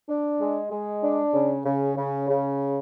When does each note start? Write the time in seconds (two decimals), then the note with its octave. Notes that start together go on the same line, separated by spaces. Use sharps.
0.08 D4
0.40 G#3
0.71 G#3
1.02 D4
1.34 C#3
1.65 C#3
1.96 C#3
2.28 C#3